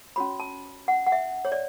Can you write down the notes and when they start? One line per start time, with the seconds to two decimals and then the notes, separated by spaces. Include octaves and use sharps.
0.16 C#4 F#4 C#5 B5
0.40 A5
0.88 F#5
1.07 F#5
1.12 E5
1.45 C#5
1.52 D5